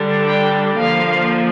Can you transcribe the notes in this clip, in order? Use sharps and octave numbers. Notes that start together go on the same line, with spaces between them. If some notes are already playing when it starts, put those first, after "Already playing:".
Already playing: D3 G3 D4
G5
D3 F3 A#3 F5